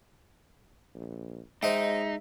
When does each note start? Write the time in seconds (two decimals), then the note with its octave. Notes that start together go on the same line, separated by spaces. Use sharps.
0.95 A#1
1.63 G#3 D#4 C5 D#5 E5 G5